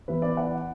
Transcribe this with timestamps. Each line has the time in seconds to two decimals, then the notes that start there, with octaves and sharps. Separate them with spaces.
0.08 E3 B3 E4 B4
0.22 D5
0.37 F#5